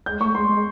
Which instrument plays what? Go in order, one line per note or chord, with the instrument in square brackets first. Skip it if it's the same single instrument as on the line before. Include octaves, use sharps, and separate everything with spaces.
[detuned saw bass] G#3 [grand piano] G6
[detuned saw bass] A3 [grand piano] C#6
[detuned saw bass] G#3 [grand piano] C6
[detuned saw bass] G#3